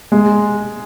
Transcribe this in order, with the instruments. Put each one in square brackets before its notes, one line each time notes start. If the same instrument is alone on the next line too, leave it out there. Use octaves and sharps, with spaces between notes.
[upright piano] G#3